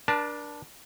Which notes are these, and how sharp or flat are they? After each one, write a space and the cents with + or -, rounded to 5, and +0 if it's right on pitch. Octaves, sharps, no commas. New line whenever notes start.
D4 +0 A#4 +45 A5 +0